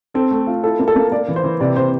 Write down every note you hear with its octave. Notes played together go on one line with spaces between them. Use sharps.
C4 A4
A3
F4
E4 A4
A#3
A4
A#3
A#3 D5
E3
C5
E3
C3 D5
C3 C5